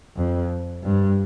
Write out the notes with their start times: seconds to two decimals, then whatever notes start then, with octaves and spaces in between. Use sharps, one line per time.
0.17 F2
0.84 G2